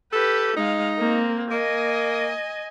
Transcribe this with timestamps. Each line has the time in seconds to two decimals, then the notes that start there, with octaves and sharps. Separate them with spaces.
0.12 G4 A4 B4
0.57 G#3 D#4 F5
0.99 A#3 C4
1.51 A#3 D#5 G#5